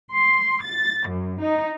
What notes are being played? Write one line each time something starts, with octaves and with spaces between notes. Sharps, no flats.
C6
A6
F#2
D#4